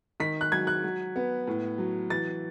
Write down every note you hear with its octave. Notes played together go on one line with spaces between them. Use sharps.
D#3 B6
F#6
F#3 G#6
F#6
F#3
B3
A2
F#3
E3 A6